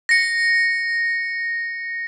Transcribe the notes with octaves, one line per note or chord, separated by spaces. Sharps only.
A#6 C#7